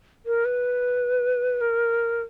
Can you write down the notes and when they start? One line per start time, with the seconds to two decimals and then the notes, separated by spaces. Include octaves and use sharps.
0.26 A#4
0.45 B4
1.61 A#4